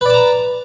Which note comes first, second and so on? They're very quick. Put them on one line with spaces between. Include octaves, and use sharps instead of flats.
B4 D5 A5 A#5